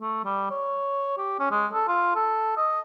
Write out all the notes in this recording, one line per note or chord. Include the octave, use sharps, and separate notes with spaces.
A3
G3
C#5
G4
C#4
G#3
A4
F4
A4
D#5